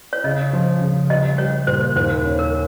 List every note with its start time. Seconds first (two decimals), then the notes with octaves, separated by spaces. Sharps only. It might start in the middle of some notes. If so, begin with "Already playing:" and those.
0.13 C#5
0.24 C#3 D#5
0.53 F3
0.82 C#3
1.10 G3 D#5
1.38 G3 C#5
1.67 A#2 C5
1.96 D#2 C5
2.25 C#4
2.39 A#4